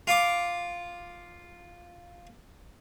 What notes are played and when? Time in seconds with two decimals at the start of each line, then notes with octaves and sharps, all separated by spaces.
0.07 F4 D6